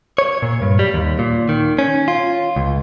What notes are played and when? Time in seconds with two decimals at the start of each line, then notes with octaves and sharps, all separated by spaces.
0.18 C#5
0.42 A#2
0.62 G2
0.79 G3
0.94 D#2
1.19 A#2
1.49 D#3
1.79 C#4
2.08 F4
2.56 C#2